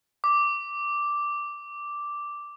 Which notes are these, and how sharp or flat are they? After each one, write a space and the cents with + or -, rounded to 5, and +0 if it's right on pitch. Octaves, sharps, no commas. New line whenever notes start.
D6 -5